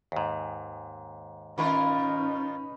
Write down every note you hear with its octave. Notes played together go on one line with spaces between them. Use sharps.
D#2 G#2
D#3 C#4 D#4 F4 A#4 B4 G#5